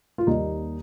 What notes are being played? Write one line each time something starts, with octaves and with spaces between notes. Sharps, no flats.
F4
D#2 D#3 G3 A#3 D#4